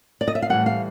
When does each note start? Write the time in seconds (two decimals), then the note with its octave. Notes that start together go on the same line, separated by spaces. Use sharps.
0.21 D5
0.28 D#5
0.35 E5
0.42 F5
0.50 A2 E3 G3 F#5
0.66 F5